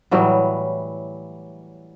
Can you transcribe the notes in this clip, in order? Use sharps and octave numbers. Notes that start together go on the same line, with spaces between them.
A2 E3 F#3 G3